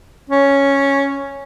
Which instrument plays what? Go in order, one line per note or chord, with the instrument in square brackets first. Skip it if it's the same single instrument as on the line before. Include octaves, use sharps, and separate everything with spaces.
[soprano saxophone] C#4